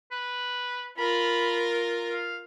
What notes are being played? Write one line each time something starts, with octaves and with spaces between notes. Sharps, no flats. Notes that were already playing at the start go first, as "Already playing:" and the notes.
B4
F4 A#4 B5
F5